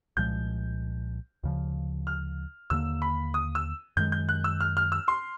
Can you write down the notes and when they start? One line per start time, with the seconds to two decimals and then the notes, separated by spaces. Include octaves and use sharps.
0.17 C2 A#2 F3 G#3 G6
1.43 D2 C#3 F3
2.07 F6
2.70 D#2 D3 G3 A#3 E6
3.02 B5
3.34 D#6
3.55 E6
3.97 F#2 D#3 G#3 G6
4.12 G6
4.29 F#6
4.44 E6
4.61 F6
4.77 F6
4.92 E6
5.08 C6